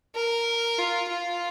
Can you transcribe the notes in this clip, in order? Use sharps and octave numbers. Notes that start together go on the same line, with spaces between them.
A#4
F4
F4